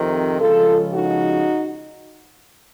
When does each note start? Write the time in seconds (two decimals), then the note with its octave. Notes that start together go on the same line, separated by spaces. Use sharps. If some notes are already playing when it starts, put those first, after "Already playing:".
Already playing: F2 C3 D#3
0.39 C#2 C#3 F3 F4 A4
0.94 D#4 F#4